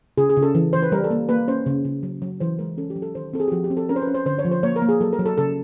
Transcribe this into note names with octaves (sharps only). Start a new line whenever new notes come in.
C#3 G#4
G#4
C#3
A4
E3
E3 C5
B4
G3 A#4
A4
A#3
A#3 B4
C#4 C5
C#3
C#3
F#3
F#3
E3 C5
G#3 A#4
C#4 A4
G4
F#3
A4
D#3 C5
C4 A4
G#4
G4
F3 F#4
G4
C4
A4
C#4 A#4
C5
B4
C#4
C5
D3 C5
C#5
F3
C5
A#3 C#5
A#4
A#3
G#4
F#3 A4
A#4
F#3
A4
C#3 A4